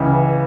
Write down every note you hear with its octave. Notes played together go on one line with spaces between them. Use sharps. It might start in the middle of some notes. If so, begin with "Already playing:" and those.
Already playing: C#2 C#3 E3